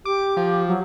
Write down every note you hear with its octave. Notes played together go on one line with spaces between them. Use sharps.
G4 D6
F3
F#3